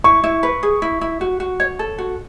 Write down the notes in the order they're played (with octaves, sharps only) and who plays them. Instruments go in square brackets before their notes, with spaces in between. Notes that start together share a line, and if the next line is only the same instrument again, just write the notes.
[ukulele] E4 [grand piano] C#6
[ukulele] E4
B4
G#4
E4
E4
F#4
F#4
C#5
A4
F#4